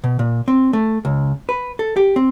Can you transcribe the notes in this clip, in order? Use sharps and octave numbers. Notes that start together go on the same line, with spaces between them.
B2
A#2
C4
A3
C#2
B4
A4
G4
C4